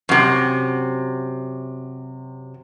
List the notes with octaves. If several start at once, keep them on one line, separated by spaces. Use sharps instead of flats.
F#2 C3